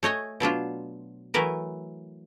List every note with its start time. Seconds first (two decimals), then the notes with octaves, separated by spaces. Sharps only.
0.03 A3 C#5 D#5 G#5
0.40 B2 F#3 D4 F4
1.34 E3 F#3 A3 A#4 B4